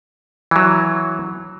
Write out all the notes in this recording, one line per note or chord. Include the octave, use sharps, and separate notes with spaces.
E3 F#3